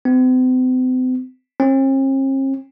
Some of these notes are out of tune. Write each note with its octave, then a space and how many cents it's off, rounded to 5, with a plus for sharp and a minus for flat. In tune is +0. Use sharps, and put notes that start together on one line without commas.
C4 -45
C4 +45